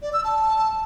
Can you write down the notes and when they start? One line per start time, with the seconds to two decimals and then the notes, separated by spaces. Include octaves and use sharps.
0.02 D5
0.13 E6
0.24 A5